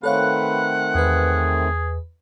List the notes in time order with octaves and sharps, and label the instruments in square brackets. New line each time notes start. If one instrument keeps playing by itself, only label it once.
[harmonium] D#3 A3 C4 [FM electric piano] A4 C#5 F5 [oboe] B4 [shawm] F#5
[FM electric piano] E2 B4 [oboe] G#4